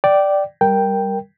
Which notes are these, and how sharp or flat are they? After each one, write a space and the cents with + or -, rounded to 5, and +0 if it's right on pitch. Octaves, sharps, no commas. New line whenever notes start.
D5 +0 G5 -20
G3 +0 A#4 +0 G5 +0